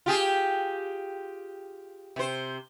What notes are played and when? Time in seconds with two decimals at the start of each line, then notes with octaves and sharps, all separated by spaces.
0.06 F4 G4 G#4
2.16 C3 C5